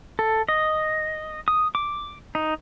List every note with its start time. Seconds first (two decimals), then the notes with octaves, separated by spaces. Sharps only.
0.19 A4
0.49 D#5
1.48 D#6
1.75 D6
2.35 D#4